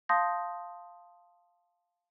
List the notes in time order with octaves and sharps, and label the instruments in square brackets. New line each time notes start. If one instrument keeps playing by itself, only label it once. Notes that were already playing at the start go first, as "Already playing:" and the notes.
[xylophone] F5 A5 C6 D#6 G6 A#6